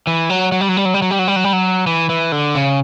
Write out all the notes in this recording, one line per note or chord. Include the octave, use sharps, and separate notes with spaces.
E3
F#3
F#3
G3
F#3
G3
F#3
G3
F#3
G3
F#3
G3
F#3
G3
F#3
E3
E3
D3
C#3